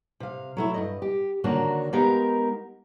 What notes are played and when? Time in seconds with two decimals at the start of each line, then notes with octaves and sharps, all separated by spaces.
0.20 C3 F5
0.57 F#3 A3 E4
0.74 G2 D#3 D#5
1.02 G4
1.44 D3 D#3 A#3 D4 F#4 C#5
1.93 G#3 B3 D#4 G4 A#4 F5